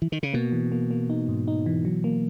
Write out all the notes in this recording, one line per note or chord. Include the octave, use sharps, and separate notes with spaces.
E3
D#3
C#3
B2 A#3
E3
A#3
A#3
D#4
G#2
D#4
E3
F#3
A#3